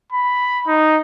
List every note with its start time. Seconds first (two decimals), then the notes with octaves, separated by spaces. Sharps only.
0.12 B5
0.67 D#4